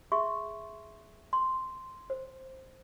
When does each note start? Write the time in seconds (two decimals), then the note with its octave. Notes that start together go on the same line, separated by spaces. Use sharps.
0.12 G#4 E5 C6 C#6
1.33 C6
2.10 C5